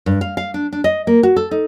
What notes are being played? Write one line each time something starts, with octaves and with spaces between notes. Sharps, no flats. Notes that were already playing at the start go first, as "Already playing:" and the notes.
G2
F5
F5
D4
D4
D#5
A#3
F#4
A4
D#4